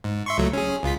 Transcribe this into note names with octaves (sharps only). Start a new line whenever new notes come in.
G#2
E5 C6 C#6
C#2 F#3 A3
C#4 G#4
C#2 F4 B6